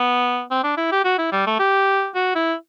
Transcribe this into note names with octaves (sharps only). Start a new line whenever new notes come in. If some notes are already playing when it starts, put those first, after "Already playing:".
Already playing: B3
C4
D4
E4
G4
F#4
E4
G3
A3
G4
F#4
E4